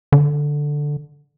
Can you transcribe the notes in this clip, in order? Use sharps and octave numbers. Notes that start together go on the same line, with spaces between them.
D3